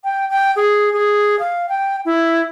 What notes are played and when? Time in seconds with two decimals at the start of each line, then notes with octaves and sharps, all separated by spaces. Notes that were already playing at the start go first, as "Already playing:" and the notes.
0.04 G5
0.30 G5
0.56 G#4
0.93 G#4
1.39 F5
1.69 G5
2.05 E4